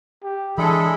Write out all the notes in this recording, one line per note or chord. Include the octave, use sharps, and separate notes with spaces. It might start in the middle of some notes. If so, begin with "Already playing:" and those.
G4
E3 G#3 D4 E4 G#4 A4 B5